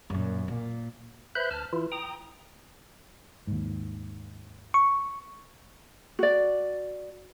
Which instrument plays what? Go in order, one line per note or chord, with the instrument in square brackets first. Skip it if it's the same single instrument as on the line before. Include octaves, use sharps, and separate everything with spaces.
[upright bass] F#2 A#2
A#2
[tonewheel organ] B4 C5 E5 B5 F#6 G6
D2 A5 F6
E3 E4 F4
G5 A#5 D#6
[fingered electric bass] D#2 G#2
[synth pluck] C#6
[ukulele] F#4 D5